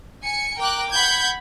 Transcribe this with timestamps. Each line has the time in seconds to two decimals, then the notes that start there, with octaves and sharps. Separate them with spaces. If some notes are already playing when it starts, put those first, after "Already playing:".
0.24 G#5 C#7
0.58 A#4 G5 D6 F#6
0.91 F#5 B5 G6 G#6